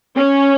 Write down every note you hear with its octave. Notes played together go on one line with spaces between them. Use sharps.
C#4